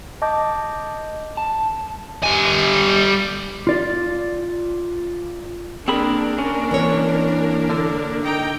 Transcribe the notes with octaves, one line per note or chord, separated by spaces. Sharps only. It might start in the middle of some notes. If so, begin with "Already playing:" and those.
D#5 A5 D6 G6
A5
G3 G#5
F4 D5
A#3 C4 D4 G#4 A#4 B5
C#4
E3 C4 C#5
D3
D#4 G5 A#5